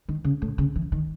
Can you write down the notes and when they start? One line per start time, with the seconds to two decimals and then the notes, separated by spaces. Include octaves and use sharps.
0.09 D#3
0.24 C#3
0.42 A2
0.58 C#3
0.76 E3
0.92 D#3